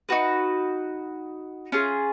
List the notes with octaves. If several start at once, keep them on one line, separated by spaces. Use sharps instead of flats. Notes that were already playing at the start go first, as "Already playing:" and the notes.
D#4 F#4 B4
C#4 F4 G#4